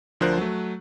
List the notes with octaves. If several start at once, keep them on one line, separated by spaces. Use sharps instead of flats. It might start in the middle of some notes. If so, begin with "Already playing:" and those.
D2 F3 D4 A#4 C5 F#6
F#3 A3